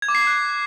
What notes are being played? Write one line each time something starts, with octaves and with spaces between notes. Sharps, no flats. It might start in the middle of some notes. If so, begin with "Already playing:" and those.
G#6
D6
C7
D6
F#6